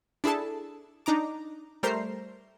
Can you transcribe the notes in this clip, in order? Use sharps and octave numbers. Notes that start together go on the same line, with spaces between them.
D4 E4 G#4 A4 A5
D4 D#4 A#5 D6
G3 A3 A#4 C5 A#5 C7